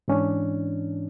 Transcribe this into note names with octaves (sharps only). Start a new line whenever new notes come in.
G#2 E3 C#4 D4